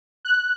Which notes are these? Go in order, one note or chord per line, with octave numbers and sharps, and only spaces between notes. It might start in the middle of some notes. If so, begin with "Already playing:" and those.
F#6